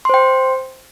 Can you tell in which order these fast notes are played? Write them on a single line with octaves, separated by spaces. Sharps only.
C6 C5 G5